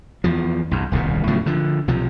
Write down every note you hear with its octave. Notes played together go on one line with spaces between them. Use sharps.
E2 F3
C2 G2
D#1 C2 B2 D#3
A2 C#3 F3 F#3
D3 F3
B1 C3 F3